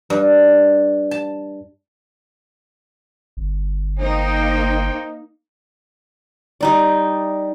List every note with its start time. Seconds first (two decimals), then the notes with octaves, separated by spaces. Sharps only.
0.10 G2
1.11 A5
3.37 G1
3.99 A#3 D#4 C5 G5
6.61 G3 D#4 D5